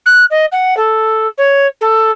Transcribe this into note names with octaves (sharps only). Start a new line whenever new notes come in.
F#6
D#5
F#5
A4
C#5
A4